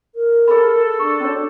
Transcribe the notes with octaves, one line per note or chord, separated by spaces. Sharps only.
A#4
G#4 A4 B5
D4 C#6
C#4 F#4 C#5